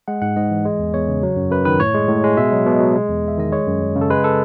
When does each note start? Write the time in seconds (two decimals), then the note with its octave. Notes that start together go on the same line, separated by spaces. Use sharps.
0.08 G#3 F#5
0.22 G#2 F#5
0.36 G#2 D#5
0.50 E3
0.65 G#3
0.80 E2
0.94 E2 C#5
1.09 C#3
1.23 F#3
1.37 F#2
1.51 F#2 B4
1.65 D#3 B4
1.79 A2 C#5
1.94 G#3
2.09 A2
2.24 G#3
2.37 B2 E5
2.52 F#3
2.66 B2
2.80 F#3
2.96 G#3
3.09 E2
3.24 E2 E5
3.38 D#3 D#5
3.52 G#3 C#5
3.67 F#2
3.81 F#2
3.96 C#3
4.01 A4
4.10 G#3 B4
4.24 A4